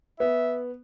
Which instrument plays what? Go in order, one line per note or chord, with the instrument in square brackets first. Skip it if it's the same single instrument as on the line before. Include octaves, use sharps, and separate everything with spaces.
[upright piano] B3 [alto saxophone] E5